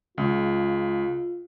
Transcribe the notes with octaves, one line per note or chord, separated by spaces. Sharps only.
C#2 F4